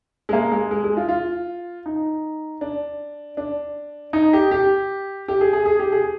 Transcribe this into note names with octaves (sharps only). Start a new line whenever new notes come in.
G#3
A#3
G#3
G#3
G#3
F4
F4
D#4
D4
D4
D#4
G4
G4
G4
G#4
G#4
G#4
G4
G#4